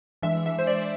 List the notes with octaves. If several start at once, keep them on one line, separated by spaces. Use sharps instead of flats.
E3 G#3 D4 E5
E5
C5
D5